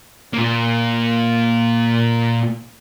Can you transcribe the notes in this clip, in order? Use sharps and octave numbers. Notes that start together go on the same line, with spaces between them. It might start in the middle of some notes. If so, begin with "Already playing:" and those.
A#2 A#3